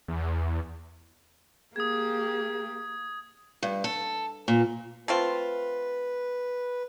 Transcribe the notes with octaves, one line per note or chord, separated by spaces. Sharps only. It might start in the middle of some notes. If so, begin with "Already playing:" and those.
E2
A#3 G4 G#4 D#6 G#6
G2
A4
A#2
A3 C4 F4 B4